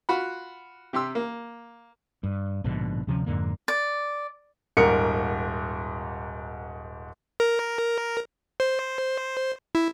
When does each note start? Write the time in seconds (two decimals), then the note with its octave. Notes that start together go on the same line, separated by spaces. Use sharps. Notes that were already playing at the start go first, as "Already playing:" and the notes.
0.09 F4 F#4 F#5 B5
0.93 C3 G4 C6 E6
1.15 A#3
2.23 G2
2.64 A#1 G#2 B2 D3
3.07 D2 C3 F3 C#4
3.26 F2 G#2 D3 A#3
3.68 D5
4.77 D#1 G#2 A#4 C#7
7.40 A#4
8.60 C5
9.75 E4